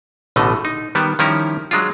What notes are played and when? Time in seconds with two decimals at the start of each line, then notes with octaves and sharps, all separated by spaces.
0.36 A1 B2 D3 A3 D#5
0.65 D#4
0.95 D#3 G3 B3
1.19 D#3 F3 G3 C#4 E4 A#4
1.71 F#3 G#3 D4 F4